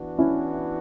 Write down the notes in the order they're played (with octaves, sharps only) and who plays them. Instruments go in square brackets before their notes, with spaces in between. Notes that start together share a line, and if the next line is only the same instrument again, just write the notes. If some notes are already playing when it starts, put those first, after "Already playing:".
Already playing: [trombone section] E3 B3 D4 F#4
[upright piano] C#4 E4